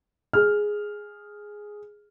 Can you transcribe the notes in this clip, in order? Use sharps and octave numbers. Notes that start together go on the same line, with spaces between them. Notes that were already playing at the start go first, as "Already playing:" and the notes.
G#4 F6